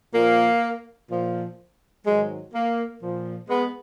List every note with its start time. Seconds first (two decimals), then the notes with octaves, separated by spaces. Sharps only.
0.14 A#2 F3 A#3
1.10 A#2 F3
2.06 G#2 D#3 F#3 G#3
2.54 A#3
3.02 A#2 F3
3.49 G#3 B3